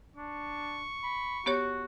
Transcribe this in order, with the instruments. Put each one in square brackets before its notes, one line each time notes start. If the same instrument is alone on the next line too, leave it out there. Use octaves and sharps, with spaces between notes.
[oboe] D4 [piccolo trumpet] C#6
[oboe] B5
[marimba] B3 G4 C#5 [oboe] F#4